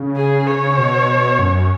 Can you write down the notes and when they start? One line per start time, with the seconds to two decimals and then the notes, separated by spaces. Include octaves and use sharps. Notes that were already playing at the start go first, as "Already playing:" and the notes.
Already playing: C#3
0.16 G#4
0.47 C#5
0.77 B2
1.39 F#2